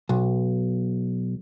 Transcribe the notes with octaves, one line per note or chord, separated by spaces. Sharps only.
B1